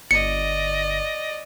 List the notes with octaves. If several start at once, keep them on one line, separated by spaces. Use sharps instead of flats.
G1 D5 D#5 C#7